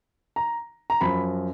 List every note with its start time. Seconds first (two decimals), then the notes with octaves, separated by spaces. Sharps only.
0.36 A#5
0.90 A#5
1.01 F#2 F3 B5